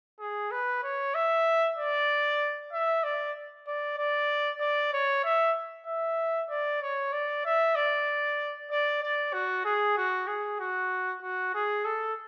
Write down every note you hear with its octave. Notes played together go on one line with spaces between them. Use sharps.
G#4
B4
C#5
E5
D5
E5
D5
D5
D5
D5
C#5
E5
E5
D5
C#5
D5
E5
D5
D5
D5
F#4
G#4
F#4
G#4
F#4
F#4
G#4
A4